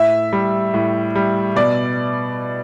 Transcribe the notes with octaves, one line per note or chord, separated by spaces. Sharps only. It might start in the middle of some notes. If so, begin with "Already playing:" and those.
Already playing: A2 E5
G3
A2
G3
B2 D5